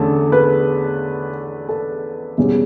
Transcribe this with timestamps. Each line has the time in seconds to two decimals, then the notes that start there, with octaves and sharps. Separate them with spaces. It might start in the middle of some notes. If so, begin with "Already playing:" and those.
Already playing: E2 D3 A3 C#4 A4
0.32 B4
1.69 A4
2.38 E2 B2 G3 C#4